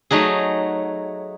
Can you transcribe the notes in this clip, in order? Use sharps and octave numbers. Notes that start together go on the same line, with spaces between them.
F#3 A3 D#4 F#4 G#4